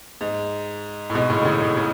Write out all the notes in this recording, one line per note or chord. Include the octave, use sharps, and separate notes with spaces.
G#2
A2
G#2 B2
A2 C#3
D3
A2 C#3
A2 C#3
C#3